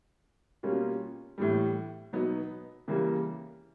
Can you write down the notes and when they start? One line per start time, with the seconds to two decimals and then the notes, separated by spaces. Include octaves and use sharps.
0.63 B2 G3 A#3 C#4 F4
1.38 A2 E3 G3
2.13 B2 F#3 B3 D#4
2.88 C#3 E3 G3 A#3